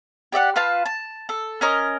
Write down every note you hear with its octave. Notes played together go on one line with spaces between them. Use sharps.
G4 D5 E5 F#5
F4 B4 F5 A5
A5
A4
C#4 A#4 D#5